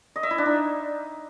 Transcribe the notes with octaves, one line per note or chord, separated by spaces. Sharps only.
D#5
E5
E4
D4
D#4